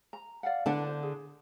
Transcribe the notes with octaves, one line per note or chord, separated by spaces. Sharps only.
A#5
D5 F5 F#5
D3 D4 B4 F#5 A5
C5
G#4